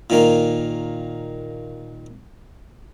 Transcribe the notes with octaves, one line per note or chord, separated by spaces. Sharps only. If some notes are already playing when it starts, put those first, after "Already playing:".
A#2 D#3 A#3